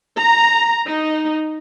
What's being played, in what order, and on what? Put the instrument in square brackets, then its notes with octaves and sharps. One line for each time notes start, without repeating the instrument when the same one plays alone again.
[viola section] A#5
D#4